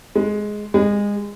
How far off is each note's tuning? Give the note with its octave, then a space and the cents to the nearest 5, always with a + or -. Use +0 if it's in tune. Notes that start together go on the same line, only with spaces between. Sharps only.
G#3 +5
G#3 -25